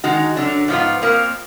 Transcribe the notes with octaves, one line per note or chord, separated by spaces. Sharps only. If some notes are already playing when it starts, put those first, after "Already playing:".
D#3 G#3 D#4 F#4
F#2 D3 F#3 D4
G#2 F3 B3 F4
F2 F3 A#3